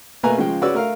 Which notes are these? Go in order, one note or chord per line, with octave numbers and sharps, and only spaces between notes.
B2 A3 A#3 B4 G#5 A#5
C#3 F3 G#3 G5
C#3 F#4 B4 C#5 D5 E6
A3 A#4 F5